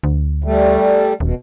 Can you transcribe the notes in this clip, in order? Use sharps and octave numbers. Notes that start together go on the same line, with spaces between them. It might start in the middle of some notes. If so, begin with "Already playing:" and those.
D2
G3 A3
D#1 B2